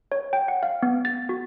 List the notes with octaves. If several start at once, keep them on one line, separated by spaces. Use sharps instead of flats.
C#5
G5
F#5
F5
B3
A6
F#4